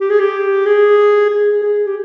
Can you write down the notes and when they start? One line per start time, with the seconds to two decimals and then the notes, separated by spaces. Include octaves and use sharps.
0.01 G4
0.10 G#4
0.19 G4
0.66 G#4
1.30 G#4
1.63 G#4
1.86 G4